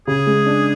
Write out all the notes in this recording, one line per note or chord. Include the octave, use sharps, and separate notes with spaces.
C#3 G#4
G#3
D4